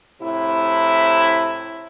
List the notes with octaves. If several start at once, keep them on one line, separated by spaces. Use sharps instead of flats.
A2 C3 E4